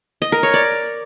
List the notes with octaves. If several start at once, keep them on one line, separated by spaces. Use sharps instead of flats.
D#5
A#4
C#5
D5